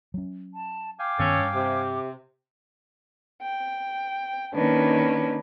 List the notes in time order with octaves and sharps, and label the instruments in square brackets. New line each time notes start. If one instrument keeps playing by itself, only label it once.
[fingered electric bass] F#3 C#4
[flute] A5
[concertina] F5 G5 G#5 [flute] D6
[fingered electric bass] G2 D#3 B3 [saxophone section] C#4 A4
[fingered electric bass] G2
[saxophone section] C3
[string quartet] G5
D#3 A#3 C#4 D4 B4